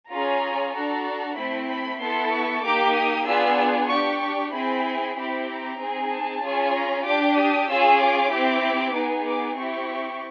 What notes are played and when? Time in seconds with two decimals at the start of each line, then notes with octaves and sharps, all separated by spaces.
0.10 C#4 F4 G#4 A#5
0.73 D4 F#4 A4 A#5
1.36 A3 C4 E4 B5
1.68 B5
1.99 B3 E4 A4 C6
2.31 C#6
2.62 A#3 D#4 G4 D6
2.95 D#6
3.25 B3 D4 F4 G#4 E6
3.89 D4 G4 C#6
4.21 C#6
4.52 C4 E4 G#4 B5
5.15 C4 E4 G4 B5
5.47 A#5
5.79 C4 D#4 G#4
6.10 A5
6.41 C#4 F4 G#4
6.74 A#5
7.05 D4 G4 D6
7.36 D#6
7.68 C#4 F4 G#4 E6
7.99 D6
8.31 C4 E4 G4
8.94 B3 D#4 G#4
9.25 D6
9.57 C4 E4 G4 C#6